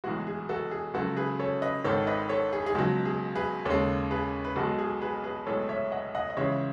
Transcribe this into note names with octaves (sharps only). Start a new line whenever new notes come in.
B1 A2 E3 G#3 F#4
G#4
F#4 A4
G#4
C#2 C#3 F#3 F#4 A4
G#4 B4
A4 C#5
B4 D#5
G#1 G#2 D#3 A4 C#5
B4 D#5
A4 C#5
G#4
G#4
C#2 B2 F#3 F#4
G#4
G#4 B4
D#2 C#3 G#3 A4 C#5
G#4 B4
B4
B1 B2 G#3 F#4 A4
G#4
G#4 B4
G#4 B4
B1 A2 G#3 A4 C#5
C#5 E5
D#5 F#5
D#5 F#5
D#5
C#2 C#3 E3 G#3 C#5 E5